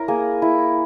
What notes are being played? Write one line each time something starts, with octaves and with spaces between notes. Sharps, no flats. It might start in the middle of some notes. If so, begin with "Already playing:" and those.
Already playing: E4 A#4 C#5
A#3 G#4
E4